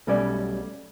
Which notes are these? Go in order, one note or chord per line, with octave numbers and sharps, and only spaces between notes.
B1 B2 G3 A3 C#4 D5